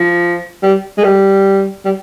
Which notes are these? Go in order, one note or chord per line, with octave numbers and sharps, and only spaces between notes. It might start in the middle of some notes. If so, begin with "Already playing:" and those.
Already playing: F3
G3
G#3
G3
G3